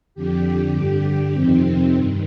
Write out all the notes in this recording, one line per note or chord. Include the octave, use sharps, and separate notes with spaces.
F2 D3 G4
G2 D3 G4
F2 C3 D#3 C4
G2 D#3